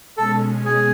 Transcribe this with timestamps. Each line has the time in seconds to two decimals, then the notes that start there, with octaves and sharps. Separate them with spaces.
0.17 B2 G#3 C#4 A4
0.65 G#4